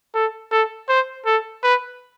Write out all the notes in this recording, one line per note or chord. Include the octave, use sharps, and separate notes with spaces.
A4
A4
C5
A4
B4